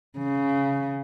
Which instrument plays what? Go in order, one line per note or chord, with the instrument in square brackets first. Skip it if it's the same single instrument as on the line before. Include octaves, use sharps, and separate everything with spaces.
[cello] C#3